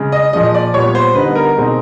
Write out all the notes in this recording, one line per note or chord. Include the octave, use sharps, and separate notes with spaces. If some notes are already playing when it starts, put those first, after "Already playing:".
Already playing: C#3 G#3
D#5
A#2 F3 G#3 D#5
D5
A#2 G3 B3 C#5
C5
D3 G3 B3 D#4 B4
A#4
B2 G#3 C4 D#4